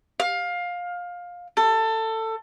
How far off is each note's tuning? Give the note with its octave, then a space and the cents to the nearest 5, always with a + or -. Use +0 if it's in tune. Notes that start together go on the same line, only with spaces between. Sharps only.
F5 +20
A4 +20